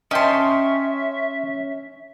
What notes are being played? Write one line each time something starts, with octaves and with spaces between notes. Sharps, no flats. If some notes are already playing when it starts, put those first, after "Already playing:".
C#4 D#5 E5 G5 A5 C6